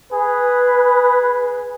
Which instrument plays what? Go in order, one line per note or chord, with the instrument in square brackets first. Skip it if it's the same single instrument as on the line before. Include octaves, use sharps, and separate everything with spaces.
[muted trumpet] G#4 [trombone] B4